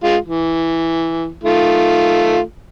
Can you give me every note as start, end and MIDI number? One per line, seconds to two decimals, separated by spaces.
0.04 0.16 56
0.04 0.16 65
0.24 1.32 52
1.44 2.40 51
1.44 2.40 57
1.44 2.40 65